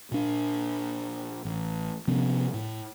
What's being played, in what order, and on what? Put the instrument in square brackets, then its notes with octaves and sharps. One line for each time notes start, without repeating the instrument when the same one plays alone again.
[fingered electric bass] A#2 D4
A1
C3 F3 B3 C#4
A2